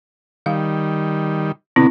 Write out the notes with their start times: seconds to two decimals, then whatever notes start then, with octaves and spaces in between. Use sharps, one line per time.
0.46 D#3 G3 F5
1.76 B2 D3 B3 C4 E4